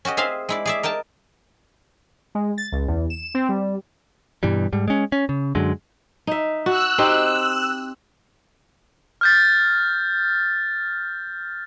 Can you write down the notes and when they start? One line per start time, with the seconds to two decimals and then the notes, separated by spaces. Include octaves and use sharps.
0.05 C#4 F#4 G4 D#5
0.17 C4 G#4 E5 F5 C6
0.49 G#3 E4 D5
0.65 G#4 D5 E5
0.83 A#4 D#5 G5 A5
2.35 G#3
2.58 A6
2.72 C#2
2.88 E2
3.10 E7
3.34 C4
3.49 G3
4.43 G2 B2 E3 G3
4.73 G#2 G3
4.88 G#3 C#4
5.12 C#4
5.29 C#3
5.55 F#2 D3 F#3 G#3
6.27 D#4 E5
6.66 F#4 E6 F#6
6.98 C4 D#4 G4
9.21 F6 G6 A6